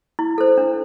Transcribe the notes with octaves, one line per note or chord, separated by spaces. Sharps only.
E4
A4 C5
D4